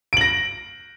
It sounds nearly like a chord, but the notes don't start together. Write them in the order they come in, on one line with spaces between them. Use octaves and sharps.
D7 F#7 A#6